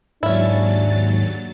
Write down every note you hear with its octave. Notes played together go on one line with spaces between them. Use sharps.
D#2 G#2 F#3 C#4 D4 E4 A6